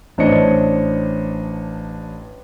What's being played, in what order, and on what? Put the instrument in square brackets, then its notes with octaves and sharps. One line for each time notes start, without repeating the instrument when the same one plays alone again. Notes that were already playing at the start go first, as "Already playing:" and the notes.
[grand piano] A1 D4 C5 C#5 D#5 C#7